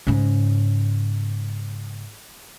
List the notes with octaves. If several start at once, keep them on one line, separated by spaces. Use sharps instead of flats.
G#2 C#3